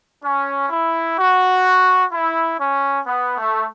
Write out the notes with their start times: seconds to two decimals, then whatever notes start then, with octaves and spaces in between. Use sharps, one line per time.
0.23 C#4
0.69 E4
1.17 F#4
2.11 E4
2.58 C#4
3.05 B3
3.37 A3